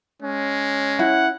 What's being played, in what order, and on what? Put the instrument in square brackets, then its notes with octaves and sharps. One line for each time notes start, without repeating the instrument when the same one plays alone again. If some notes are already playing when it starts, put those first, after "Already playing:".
[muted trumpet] G#3 [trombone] C#4
[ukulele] E4 [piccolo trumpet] F#5